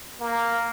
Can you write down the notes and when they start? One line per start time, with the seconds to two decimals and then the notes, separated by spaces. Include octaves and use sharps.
0.20 A#3